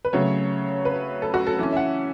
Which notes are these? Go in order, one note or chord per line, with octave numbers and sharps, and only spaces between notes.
B4
C#3 F#3 A3 C#5
B4
A4
F#4
A4
E3 C#4 A4
E5
F#5